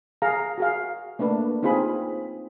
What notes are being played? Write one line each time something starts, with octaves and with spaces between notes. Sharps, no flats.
G#4 F5 A#5
F#4 G#4 F5
A3 A#3 D4 B4
C4 D#4 F4 G#4 B5